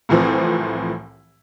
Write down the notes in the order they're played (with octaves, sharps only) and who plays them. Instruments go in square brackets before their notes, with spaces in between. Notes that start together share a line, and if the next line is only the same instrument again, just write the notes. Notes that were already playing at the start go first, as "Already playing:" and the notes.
[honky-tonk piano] C2 A2 E3 F3 C4